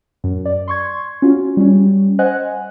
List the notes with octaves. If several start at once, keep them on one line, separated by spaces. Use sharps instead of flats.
F#2
D5
C6 C#6 G#6
C#4 F4 F#4
G3 C#4
C5 D#5 F#5 G#5 F#6